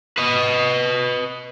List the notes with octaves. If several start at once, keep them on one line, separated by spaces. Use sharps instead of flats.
B4 D#5